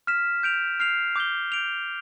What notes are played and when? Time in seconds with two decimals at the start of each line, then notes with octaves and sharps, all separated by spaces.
0.07 F6 B6 E7
0.43 G6 D7 F7
0.80 F6 C7 F7
1.16 D6 G6 C7 G7
1.52 G6 D7 F7